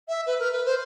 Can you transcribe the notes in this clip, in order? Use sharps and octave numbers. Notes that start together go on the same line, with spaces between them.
E5
B4
A#4
B4
C5